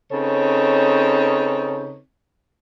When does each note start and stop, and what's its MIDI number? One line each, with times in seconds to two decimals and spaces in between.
0.12 1.98 49
0.12 1.98 60
0.12 1.98 63
0.12 1.98 69
0.12 1.98 71
0.12 1.98 73